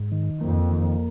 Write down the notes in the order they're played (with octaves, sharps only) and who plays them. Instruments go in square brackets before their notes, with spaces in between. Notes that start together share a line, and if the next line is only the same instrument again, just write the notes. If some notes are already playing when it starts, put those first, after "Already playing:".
Already playing: [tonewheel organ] G#2
D#3
[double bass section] F2 [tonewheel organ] A#3
[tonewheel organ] D#3